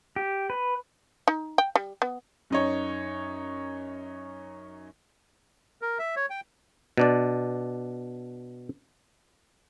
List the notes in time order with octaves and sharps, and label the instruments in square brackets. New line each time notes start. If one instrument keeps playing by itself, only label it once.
[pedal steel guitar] G4
B4
[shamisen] D#4
G5
G3
B3
[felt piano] F#2 D#4 C#5
[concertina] A#4
E5
C#5
G5
[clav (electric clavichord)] B2 D4 D5